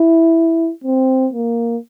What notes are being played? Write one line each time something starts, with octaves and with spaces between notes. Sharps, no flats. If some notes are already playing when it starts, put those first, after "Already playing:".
Already playing: E4
C4
A#3